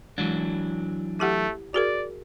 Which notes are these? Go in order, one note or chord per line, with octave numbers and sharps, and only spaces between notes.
E3 F#3 G#3 D4
A3 E4 G4 F#5
F#4 G#4 A#4 D5